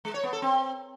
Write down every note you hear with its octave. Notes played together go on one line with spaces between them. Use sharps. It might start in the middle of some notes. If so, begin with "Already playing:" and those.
G#3
C#5
B3
A4
C4